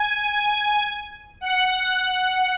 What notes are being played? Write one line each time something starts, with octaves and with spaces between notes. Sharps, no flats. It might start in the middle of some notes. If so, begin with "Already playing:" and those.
Already playing: G#5
F#5